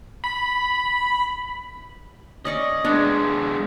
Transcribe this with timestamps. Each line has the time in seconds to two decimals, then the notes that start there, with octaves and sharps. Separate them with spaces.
0.24 B5
2.45 C#4 D5 D#5 C#6
2.85 G#3 B3 D4